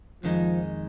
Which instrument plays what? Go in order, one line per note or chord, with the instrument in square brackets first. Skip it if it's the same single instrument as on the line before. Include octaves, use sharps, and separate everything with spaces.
[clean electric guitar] F2 D#3 G#3 D#4 [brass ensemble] F3